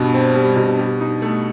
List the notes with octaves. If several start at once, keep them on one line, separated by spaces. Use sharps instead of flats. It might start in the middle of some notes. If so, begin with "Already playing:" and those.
Already playing: G2 B2
C4
G3
B2
G4
D#4
A3